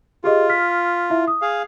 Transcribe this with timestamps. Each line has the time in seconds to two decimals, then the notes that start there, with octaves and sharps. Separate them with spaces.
0.24 F4 G4 G#4 D#5
0.49 F6 B6
1.10 E4 E5
1.28 D#6
1.42 G#4 F5